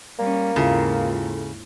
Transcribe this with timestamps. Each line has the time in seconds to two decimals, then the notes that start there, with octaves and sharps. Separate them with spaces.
0.19 G3 A#3 C#4
0.56 D#2 G#2 C#3 E4 F4 A4